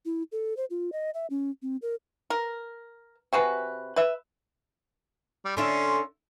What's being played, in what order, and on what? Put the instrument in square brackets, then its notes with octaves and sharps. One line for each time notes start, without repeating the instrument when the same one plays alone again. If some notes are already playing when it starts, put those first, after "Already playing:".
[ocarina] E4
A4
C5
F4
D#5
E5
C#4
C4
A#4
[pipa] A#4
C3 F#4 G#4 B4
B4 E5
[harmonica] G3
[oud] D3 D4 E4 [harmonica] C#4 C6